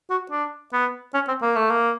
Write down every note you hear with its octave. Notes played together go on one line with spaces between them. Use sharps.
F#4
D4
B3
C#4
C4
A#3
A3
A#3